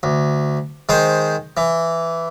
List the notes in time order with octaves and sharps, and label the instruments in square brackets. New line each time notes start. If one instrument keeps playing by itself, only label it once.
[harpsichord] D2
D#3 G#3 C5
E3